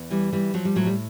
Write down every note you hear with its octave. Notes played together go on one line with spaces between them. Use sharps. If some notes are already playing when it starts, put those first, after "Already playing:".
Already playing: E2
E3 G3
E3 G3
F3 F#3
G3
A2 F#3
G3